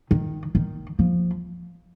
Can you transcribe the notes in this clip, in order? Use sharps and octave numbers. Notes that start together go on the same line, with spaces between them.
D#3
D#3
F3